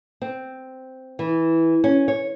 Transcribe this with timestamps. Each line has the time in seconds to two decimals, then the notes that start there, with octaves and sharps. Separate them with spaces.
0.22 C4
1.19 E3
1.84 C#4
2.08 C#5